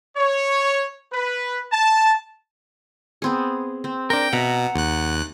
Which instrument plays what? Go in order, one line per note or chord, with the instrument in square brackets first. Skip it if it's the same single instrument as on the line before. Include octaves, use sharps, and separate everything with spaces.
[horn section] C#5
B4
A5
[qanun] B3 C4 G#4
C4
[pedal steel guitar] D4 A#4 [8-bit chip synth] G5
[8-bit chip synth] B2 [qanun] E5 [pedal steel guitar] F#5 A#5
[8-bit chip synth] D#2 F#6